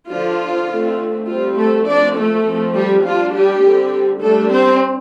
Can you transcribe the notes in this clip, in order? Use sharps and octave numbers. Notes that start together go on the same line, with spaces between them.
D3 F3 D4 F4
D3 A3 C4
G3 C4 F4
A3 A4
F3 C4 D4 D5
A3 A4
F3 C4
G3 G4
G3 D4 F4
G3 G4
D3 G3 C4
G3 A3 D4 A4
C4 C5